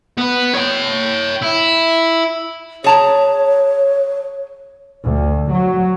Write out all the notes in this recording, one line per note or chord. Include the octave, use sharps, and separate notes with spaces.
B3
C#5 G5
E4
G#4 C#5 A5 A#5
D2
F#3